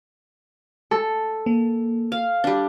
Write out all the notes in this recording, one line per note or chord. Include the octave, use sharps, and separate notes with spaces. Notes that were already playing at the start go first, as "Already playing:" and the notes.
A4
A#3
F5
G3 D4